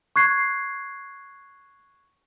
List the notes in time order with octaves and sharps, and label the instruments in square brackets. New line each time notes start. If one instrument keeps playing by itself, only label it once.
[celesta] C#6 F#6 G#6 C7